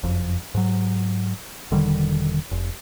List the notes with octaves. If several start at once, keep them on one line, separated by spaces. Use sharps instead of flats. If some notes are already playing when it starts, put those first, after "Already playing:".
F#1 F2
G#2 F#3
E1 D3 D#3 G3
F1